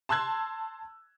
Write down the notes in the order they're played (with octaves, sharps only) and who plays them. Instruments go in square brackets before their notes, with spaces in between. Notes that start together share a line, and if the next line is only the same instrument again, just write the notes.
[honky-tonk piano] A5 C6 E6 F#6 G#6